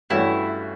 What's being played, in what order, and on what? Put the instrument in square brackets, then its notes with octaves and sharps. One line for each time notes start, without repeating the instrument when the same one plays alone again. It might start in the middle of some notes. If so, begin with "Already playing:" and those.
[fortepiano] G2 E3 A3 C#4 F#4 [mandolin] E4